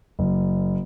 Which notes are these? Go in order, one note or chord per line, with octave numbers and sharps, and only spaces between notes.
F#1